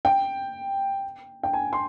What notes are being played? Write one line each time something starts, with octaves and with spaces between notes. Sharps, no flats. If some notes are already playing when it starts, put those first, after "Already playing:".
G5
G5
G#5
C6